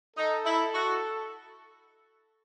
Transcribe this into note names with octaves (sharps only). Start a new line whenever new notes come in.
D#4 A4
E4
F#4